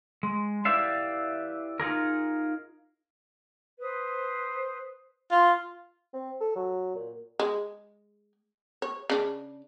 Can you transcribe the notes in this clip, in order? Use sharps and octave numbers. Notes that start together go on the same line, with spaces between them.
G#3
E4 G4 B4 D5 E5 F5
D#4 F4 G#4 A#4
B4 C5 D#6
F4 C6
C4
A4
F#3
A#2
G#3
C#5
C#3 D4